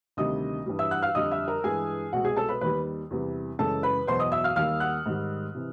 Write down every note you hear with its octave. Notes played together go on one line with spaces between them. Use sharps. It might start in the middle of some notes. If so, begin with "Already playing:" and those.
D2 C3 D#3 G3 D#5 D#6
G2 E3 G3
E5 E6
F#5 F#6
F5 F6
F2 D3 G3 D#5 D#6
E5 E6
A#4 A#5
G2 E3 G#3 G#4 G#5
C2 B2 G#3 F#4 F#5
G#4 G#5
A4 A5
B4 B5
D#2 D#3 G3 B4 B5
E2 C3 E3 G3
F#2 C#3 E3 G#3 A4 A5
B4 B5
E2 B2 F#3 C5 C6
D#5 D#6
E5 E6
F5 F6
D#2 D#3 G3 F5 F6
F#5 F#6
G#2 D#3 G3
C3 E3